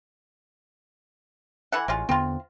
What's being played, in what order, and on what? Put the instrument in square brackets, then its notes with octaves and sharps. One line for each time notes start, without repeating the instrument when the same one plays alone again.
[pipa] E3 A4 F#5
[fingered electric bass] A1 [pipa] G#3 C#4 F4
[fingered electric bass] E2 D3 B3 [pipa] C4 F4